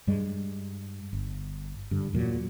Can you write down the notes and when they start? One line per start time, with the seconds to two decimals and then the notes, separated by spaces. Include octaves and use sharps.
0.07 G2 G3 G#3
1.13 G1
1.91 G2 D3
2.13 E2 A#2 F#3